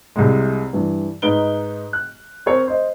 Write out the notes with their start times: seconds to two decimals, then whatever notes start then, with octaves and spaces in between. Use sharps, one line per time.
0.16 C2 C3 G#3
0.73 G2 E3
1.22 G#2 D#4 B4 D7 G7
1.93 F#6
2.46 C4 A#4 C5 C#5
2.68 C5 D#5